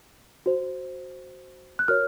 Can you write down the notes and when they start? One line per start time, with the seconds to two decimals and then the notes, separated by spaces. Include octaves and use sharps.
0.46 F#4 C5
1.79 F#6
1.88 F#4 A#4 C#5 F6